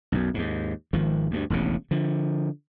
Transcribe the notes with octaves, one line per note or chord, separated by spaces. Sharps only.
B1 F#2
D#2 G#2
G#1 D#3 F3
D2 G2
E1 A1 D#2 C#3
D3 F3